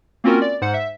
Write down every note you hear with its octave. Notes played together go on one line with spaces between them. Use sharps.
A#3 C4 C#4 F4 F#4 A#4
D5
G#2 C5 F#5
E5